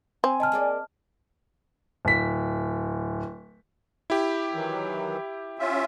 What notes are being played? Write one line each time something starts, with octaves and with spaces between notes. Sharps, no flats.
C4 G#5
D2 C#3 D#5 A5 F6
A#3 G#4 D5
D1 B6
E4 G4
D#3 E3 F#3
C#4 F4 E5